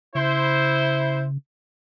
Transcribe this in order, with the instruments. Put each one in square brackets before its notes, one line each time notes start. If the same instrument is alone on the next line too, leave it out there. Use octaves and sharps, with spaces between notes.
[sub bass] C#3 [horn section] E4 C5